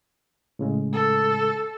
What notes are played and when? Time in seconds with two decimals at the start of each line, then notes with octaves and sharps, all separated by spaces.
0.59 A2 C#3 G#3
0.93 A4